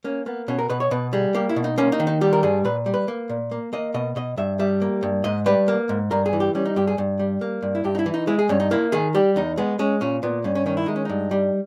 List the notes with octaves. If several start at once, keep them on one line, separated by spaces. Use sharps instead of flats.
A#3 C#4
A#3 B3
B2 C#4
A#4
B2 B4
C#5
B2 B4
G3 G#4
A#3 G4
E4
B2
D#4
A#3 C#4
D#4
D#3
D#4
G3 G4
A#4
G2 G#4
A#2 B4
G3
B4
A#3
A#2
A#3
A#3 D#5
B2 D#5
B2 D#5
G2 E5
G3 E5
A#3
G2
G#2 D#5
G3 B4
A#3
G#2
G2 A#4
G#4
E3
G4
G3 C#4
D#4
G2 G4
G#4
G2
G3
A#3
G2
E4
G2 G4
D#4
E4
E3
D#4
G#3 E4
G#4
G2 C#4
D#4
A#3 E4
D#3 G#4
G3 G4
E2 D#4
G#3 B3
G#3 C#4
A#2 C#4
A#2 B3
G2 C#4
C#4
D#3 C#4
E4
G#3 D#4
C#4
G2 D#4
G3